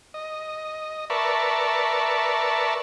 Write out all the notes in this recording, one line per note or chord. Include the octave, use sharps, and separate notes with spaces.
D#5
A#4 B4 D5 E5 A5 C#6